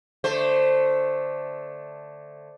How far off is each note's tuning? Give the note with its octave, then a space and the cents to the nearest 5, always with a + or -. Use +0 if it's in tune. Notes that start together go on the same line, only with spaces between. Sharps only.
D3 +0 A3 +0 C5 +0